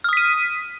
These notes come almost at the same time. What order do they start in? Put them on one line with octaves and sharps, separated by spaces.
F6 D#6 B6 D#7